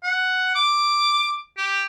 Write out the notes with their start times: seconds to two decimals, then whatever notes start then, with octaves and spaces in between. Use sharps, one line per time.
0.03 F#5
0.55 D6
1.57 G4